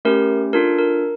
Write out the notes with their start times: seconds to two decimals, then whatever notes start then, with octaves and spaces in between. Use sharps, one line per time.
0.05 A3 C#4 G4 A#4
0.53 D4 F4 A4 A#4
0.79 A#4